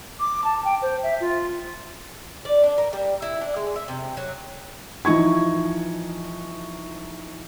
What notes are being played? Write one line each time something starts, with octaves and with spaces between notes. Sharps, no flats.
D6
A5
G5
C5
E5
F4
D5
D4
A#4
G3
E4
D4
G#3
E5
C3
F#3
E3 F3 D#4 C#6 G#6